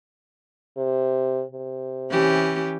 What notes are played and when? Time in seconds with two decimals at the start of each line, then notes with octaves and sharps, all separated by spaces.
0.77 C3
1.52 C3
2.10 E3 C#4 G4